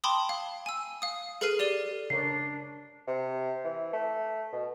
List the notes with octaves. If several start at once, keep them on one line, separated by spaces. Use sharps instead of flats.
G5 A5 B5 C6 D6 D#6
F5
G#5 E6
F5 D#6
G#4 A4 B4 F6 C7 D#7
G4 D5 D#7 G7
C#3 D4 A#4 C#5 C7
C3
E3
A3
B2